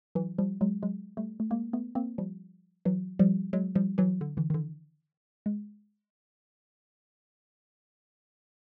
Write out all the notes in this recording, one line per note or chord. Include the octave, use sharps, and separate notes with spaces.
E3 F#3
F3 G3
F#3 G#3
F#3 G#3
G3 A3
A3
G#3 A#3
A3 B3
A#3 C4
F3 G3
E3 F#3
F3 G3
F#3 G#3
F3 G3
E3 F#3
D3
D3 E3
D#3
D3 E3
G#3